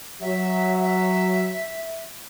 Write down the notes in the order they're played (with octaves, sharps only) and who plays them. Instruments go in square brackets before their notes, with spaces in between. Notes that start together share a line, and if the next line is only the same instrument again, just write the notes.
[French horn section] F#3 [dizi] E5
[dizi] E5